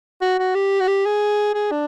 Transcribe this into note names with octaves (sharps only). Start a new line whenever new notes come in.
F#4
F#4
G4
F#4
G4
G#4
G#4
D4